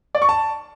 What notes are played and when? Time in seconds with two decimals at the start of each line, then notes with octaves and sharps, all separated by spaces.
0.15 D5
0.22 C#6
0.29 A5